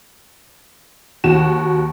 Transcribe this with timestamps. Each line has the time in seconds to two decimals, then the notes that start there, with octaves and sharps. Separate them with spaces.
1.24 D#2 F#4 E7